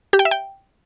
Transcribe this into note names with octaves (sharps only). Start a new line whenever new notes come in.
G4
G5
E5
G5